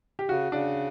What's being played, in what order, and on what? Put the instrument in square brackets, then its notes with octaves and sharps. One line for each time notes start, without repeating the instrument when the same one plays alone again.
[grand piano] G4
[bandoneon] C#3 [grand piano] F#4
[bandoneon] C#3 [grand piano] D4